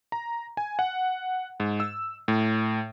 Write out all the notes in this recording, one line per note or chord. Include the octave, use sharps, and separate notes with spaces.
A#5
G#5
F#5
G#2
E6
A2